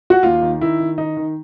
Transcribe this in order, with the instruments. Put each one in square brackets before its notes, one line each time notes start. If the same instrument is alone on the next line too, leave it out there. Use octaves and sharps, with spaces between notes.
[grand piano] F#4
D#2 F4
D#3
D#3 E4
D#3
D#3 D#4
D#3